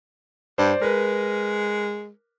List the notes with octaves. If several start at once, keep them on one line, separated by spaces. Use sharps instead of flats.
G2 C5 D5
G#3 A#4 B4